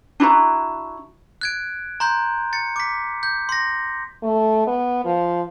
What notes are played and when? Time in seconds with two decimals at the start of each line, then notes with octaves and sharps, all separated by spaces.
0.20 D4 E4 F#4 A#5
1.41 F#6 G#6 D7
2.00 A#5 C6 G6
2.53 A6 C#7
2.76 D6 B6
3.23 G6
3.49 C6 A#6
4.23 A3
4.67 B3
5.05 F3